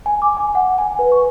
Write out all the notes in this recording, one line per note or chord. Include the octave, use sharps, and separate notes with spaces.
G#5
D6
G#5
F#5
G#5
B4
C#6